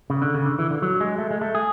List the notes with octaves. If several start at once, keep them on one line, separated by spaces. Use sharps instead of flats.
C#3
D3
C#3
D3
E3
D3
F#3
G#3
A3
G#3
A3
G#4